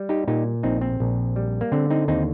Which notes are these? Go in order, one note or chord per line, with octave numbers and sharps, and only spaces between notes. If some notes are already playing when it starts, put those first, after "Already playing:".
Already playing: G3
D#4 G4
A#2 D#4 G4
A#1 C4 D#4
C4
A#1
G3
A#3
D3 C4
C4 D#4
D#2 C4 D#4